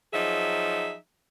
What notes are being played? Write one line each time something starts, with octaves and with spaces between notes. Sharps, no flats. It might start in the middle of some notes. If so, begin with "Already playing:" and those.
F3 F#3 D#4 G#4 E5